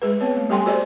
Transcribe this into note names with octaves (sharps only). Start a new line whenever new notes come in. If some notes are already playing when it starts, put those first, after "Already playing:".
G#3 G#4 B4
B3 C4 B4 C#5
A3
G3 G4 A4 G5 G#5 C6
F#4 G#4 C5 D5 D#5